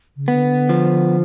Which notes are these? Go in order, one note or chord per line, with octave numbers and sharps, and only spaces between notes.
C#3
D3 B3
F3